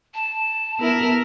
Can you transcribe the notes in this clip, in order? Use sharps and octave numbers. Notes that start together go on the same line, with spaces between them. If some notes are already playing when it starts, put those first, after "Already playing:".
A5
B3 E4 A#4